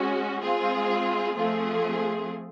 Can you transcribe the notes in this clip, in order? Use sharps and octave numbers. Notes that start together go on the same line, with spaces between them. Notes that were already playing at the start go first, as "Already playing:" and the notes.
Already playing: G#3 C#4 F#4
G#3 C4 F4 G#4
F3 A3 C4 F4 G#4